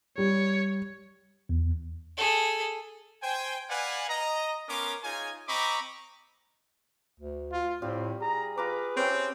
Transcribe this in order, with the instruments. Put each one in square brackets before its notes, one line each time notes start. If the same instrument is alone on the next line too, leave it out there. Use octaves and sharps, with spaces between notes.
[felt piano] G3 [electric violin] C#5
[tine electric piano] E2
[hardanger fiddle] G#4 A4
[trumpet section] C5 G5 G#5
B4 D5 F5 F#5 G#5
D#5 A#5
B3 C#4 A#4 C6 D6
D#4 F4 G#4 C#5 G#5
C4 D#5 A#5 B5 C#6 D6
[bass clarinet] D2
[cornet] F4
[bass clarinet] A2 [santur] G3 F4 [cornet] C4
[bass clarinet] G#4 [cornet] A#5
[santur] F4 A#5 D6 [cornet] B4
[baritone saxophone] C4 [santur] C#4 G4 E5